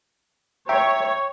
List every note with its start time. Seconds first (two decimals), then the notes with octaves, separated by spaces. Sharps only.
0.69 C#5 E5 G5 A#5